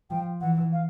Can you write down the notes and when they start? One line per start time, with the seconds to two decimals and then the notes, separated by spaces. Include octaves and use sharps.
0.10 F3 G5
0.41 E3 F#5
0.73 F5